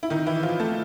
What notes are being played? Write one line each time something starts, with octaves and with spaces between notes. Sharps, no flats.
E4
D#3 D#4
E3 E4
F3 F4
A3 A4